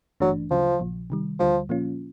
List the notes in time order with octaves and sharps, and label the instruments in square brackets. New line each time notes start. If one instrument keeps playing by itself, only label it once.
[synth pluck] G#1 G2 E3 A3 D4 [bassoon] F#3
[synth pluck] D2 C#3 F#3 [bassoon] F3
[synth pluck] A#1 A#2 F3
C3 D#3 G3
[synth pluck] D2 D3 G3 [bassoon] F3
[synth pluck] A#2 F3 A#3 C#4 F4